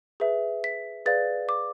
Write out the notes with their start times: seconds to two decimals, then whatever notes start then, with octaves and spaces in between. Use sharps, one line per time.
0.20 G#4 B4 E5
0.64 B6
1.06 G#4 B4 D5 F5 A6
1.49 D6